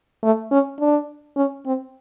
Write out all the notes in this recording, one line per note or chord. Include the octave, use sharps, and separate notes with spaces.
A3
C#4
D4
C#4
C4